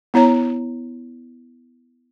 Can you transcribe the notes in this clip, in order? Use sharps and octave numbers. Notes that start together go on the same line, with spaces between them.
B3 E4 C#5 A#5